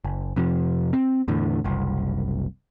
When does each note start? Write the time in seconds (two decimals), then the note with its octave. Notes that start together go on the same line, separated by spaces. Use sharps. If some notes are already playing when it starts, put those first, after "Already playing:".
0.05 F#1
0.36 F2 C3 F3
0.93 C4
1.28 E2 A2 D3
1.64 F#1 C2